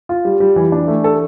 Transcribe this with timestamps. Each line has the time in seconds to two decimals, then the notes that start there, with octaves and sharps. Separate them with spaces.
0.09 F4
0.25 G3
0.40 G3
0.56 E3
0.72 D4
0.88 A3
1.04 A4